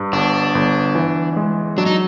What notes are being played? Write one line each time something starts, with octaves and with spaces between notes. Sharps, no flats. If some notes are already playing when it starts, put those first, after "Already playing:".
Already playing: G2
G1 D4
G1
E3
G#3
F#3 D4
D#4